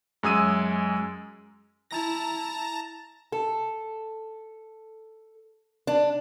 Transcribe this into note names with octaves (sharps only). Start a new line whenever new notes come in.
F#2 G#3 G#5 D#6 E6 D#7
E4 A5 A#5 A#6
A4
D4